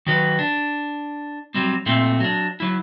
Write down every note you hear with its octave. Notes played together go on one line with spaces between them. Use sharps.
D#3 F#3 B4
D4
F#3 G3 C4
A#2 A3 C4
F#3 D4
F#3 E4